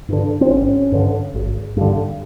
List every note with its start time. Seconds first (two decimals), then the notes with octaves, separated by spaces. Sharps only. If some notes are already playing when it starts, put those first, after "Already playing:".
0.08 G2 D3
0.41 C4
0.50 G#1 C#4
0.92 G2 D3
1.34 G#1
1.77 G2 D3